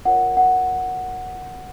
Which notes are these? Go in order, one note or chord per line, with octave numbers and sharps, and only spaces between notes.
F4 A#4 C#5 F#5
F#5